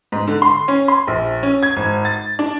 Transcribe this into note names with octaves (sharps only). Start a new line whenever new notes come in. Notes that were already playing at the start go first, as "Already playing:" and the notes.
G#2
D3
C6
C#4
C6
A#1
C#4
G#6
G#1
A6
D4